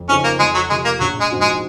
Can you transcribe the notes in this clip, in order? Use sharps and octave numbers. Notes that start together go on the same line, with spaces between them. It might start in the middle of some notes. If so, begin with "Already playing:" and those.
Already playing: F2
C#3 F3 C4 C#4 D#4
A#3
F2 G#3
F#3
C3 F3 G#3
A#3
A#1 F#3
G#3
G#2 F3 C4 F#4
G#3